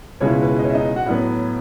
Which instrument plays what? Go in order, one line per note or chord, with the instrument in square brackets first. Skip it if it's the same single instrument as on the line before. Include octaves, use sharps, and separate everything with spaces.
[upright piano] C#2 B2 G#3 C#4 E4 C#5
B4
D#5
C#5
E5
D#4 D#5
F#4 F#5
A2 F#3 B3